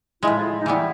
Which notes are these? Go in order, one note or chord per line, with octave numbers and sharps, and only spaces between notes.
A2 F3 G#3 E4
F4
E4
D#4
E3 G3 B3 E4